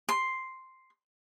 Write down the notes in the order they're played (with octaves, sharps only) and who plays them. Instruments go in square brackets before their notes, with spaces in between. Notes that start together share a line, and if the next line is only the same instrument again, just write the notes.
[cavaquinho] C6